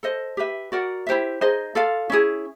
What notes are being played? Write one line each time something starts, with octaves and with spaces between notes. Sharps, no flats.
A4 C5 D#5
G4 B4 E5
F#4 A#4 D5 F#5
E4 G4 C5 E5
D#4 G#4 C5 D#5
F4 A4 D5 F5
C#4 E4 G#4